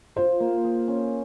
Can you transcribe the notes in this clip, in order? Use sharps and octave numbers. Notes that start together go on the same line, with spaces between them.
F4 C5
A#3
G#4
C#4